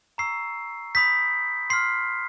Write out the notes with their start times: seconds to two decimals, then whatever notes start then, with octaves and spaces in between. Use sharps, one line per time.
0.18 A#5 C#6 E6 C7
0.95 B5 D#6 G6 B6
1.70 C6 F6 C7